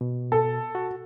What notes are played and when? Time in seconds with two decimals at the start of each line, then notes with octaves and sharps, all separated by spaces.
0.01 B2
0.32 A4
0.75 F#4